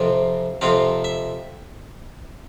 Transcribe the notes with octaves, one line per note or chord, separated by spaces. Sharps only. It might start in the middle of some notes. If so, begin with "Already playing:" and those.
Already playing: F2 C3 F3 C4 F4
F2 C3 F3 C4 F4 F5
E5